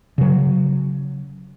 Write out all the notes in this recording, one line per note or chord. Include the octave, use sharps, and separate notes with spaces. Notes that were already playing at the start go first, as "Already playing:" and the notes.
C#3 F#3